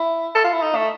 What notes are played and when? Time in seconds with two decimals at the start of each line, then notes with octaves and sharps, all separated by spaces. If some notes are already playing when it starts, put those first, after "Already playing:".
Already playing: E4
0.35 A4
0.44 F4
0.53 E4
0.62 D#4
0.75 A3